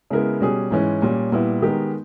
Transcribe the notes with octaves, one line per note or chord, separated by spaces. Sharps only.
C#3 G#3 B3 E4 A#4
B2 G3 C#4 G#4
G#2 E3 G#3 C#4
A#2 G3 C#4
A#2 G3 B3 E4
D#3 G#3 B3 G4 A#4